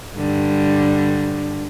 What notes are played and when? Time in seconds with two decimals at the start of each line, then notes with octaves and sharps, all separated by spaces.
0.15 G2 D3 G3